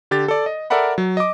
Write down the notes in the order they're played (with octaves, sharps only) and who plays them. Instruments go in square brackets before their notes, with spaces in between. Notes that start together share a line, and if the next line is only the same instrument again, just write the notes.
[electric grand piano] D3 G4 A6
A4 D5
D#5
A4 A#4 D5 E5 F#5 B5
F#3
D#5 D6